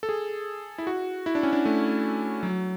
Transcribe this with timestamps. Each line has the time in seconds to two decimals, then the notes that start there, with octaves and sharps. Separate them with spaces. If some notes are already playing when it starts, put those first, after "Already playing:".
0.03 A4
0.09 G#4
0.78 E4
0.87 F#4
1.26 E4
1.35 D4
1.43 C#4
1.53 D4
1.65 A3
2.43 F#3